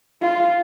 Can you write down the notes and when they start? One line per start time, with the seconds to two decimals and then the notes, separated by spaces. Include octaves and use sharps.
0.22 F4